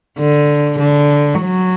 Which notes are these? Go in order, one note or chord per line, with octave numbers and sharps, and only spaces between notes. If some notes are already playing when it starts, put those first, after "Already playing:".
D3
D3
F#3